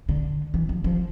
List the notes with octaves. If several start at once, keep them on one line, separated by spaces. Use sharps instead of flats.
D3
E3
F3
F3